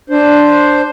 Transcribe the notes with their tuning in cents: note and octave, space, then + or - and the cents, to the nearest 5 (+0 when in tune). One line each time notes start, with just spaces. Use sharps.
D4 +0 C5 +0